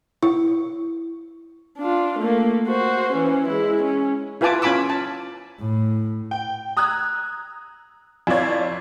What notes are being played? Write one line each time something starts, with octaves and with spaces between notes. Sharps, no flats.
E4
D4 F4
A3 A#3
F#4 C5
E3 C#4
G#3 E4
C#4
E4 F4 B4 G#5 A5 D6
C#4 F4 G#5 B5 D6 E6
A5
A2
G5
A#5 D#6 E6 F#6 G#6
F2 E4 F4 C#5 D5 G#6